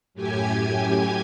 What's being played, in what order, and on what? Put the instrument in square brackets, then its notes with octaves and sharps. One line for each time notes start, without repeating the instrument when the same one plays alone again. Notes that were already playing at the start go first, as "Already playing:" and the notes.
[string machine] F#2 A2 G4 G#5 G#6